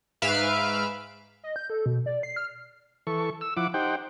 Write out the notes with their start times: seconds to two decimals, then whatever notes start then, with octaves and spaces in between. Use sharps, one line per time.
0.22 G#2 B4 E5 F5 F6 D7
1.44 D#5
1.56 G6
1.70 A4
1.86 B2
2.06 D5
2.23 C7
2.36 F6
3.07 E3 A4 C#6
3.41 E6
3.57 F3 E4 F#5 D6
3.74 D#4 G4 C5 F#5 G5